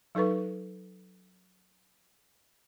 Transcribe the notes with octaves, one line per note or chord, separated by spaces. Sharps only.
F#3 D#4 A4 B4 C#6